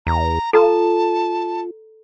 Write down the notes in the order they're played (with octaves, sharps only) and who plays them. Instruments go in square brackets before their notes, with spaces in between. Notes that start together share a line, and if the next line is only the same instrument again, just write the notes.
[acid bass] E2 [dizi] A#5
[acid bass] F4 [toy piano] A4 A#5 [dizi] A5